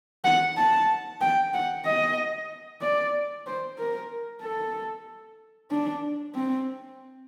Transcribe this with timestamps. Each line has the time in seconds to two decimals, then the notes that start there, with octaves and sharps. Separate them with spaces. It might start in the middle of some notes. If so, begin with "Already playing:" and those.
0.25 F#5
0.57 A5
1.21 G5
1.54 F#5
1.85 D#5
2.82 D5
3.46 C5
3.78 A#4
4.42 A4
5.71 D4
6.35 C4